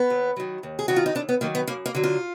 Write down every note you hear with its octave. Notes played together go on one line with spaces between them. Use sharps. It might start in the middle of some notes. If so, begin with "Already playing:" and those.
Already playing: B3
D#2
D#3 F#3
D#2
G#4
D#3 F#3 F#4
F4
D#4
D#2 D4
B3
D#3 F#3 A#3
B3
F#2 A#3
A#3
D3 F#3
F4